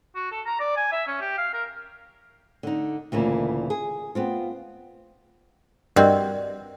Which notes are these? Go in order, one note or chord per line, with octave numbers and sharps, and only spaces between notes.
F#4
A4
A#5
D5
G#5
E5
C#4
G4
F5
A#4
D3 D#4
D2 A#2 C#3 E3
G#4
B3 C4 F4
G2 C4 F#4 A#4 D5 D#5